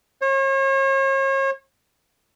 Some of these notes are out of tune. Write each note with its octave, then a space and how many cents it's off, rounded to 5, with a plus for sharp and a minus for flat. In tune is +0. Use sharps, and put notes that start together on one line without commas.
C#5 -40